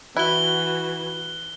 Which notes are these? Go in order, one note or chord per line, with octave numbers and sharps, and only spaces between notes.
E3 E4 F#4 F#6 G7